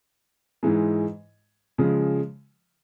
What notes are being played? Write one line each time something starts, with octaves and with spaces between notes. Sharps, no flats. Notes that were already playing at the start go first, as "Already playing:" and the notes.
G#2 E3 G#3
C#3 F3 G#3